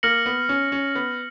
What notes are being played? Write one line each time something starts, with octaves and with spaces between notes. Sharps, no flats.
A#3 F6 A#6 C#7 F#7
B3
C#4
C#4
B3